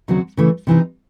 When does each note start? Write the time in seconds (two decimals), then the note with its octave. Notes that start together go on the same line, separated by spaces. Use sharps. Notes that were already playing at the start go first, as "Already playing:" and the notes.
0.08 D#2 C#3 F#3 C4 F#4
0.37 C#3 E3 A3
0.67 C3 E3 C4 D#4